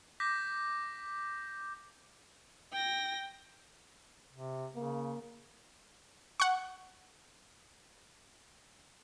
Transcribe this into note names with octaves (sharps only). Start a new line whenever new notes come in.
D6 G6 A#6 B6
G5 A#6
C3
C#3 A#3
F#5 C#6